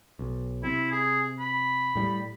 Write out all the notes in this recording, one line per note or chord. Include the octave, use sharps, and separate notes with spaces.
B1
C3 E4
G#4
B5
A2 G3